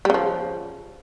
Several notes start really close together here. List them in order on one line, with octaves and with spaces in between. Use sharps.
G3 C#3 F3